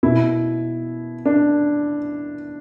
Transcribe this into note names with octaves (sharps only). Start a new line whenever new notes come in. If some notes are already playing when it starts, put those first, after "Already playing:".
B2 E4
D4